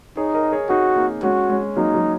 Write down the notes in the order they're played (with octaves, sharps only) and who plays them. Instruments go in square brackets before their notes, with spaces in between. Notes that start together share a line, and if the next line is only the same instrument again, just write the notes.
[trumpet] D#4 [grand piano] G#4 C#5
[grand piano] A#4 D#5
G#4 C#5
[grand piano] D#4 G#4 [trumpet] F#4
[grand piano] A#3 D#4
[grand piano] G#3 C#4 [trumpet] F#4
[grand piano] G#3 C#4
[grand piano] F#3 A#3 [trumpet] D#4
[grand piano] F#3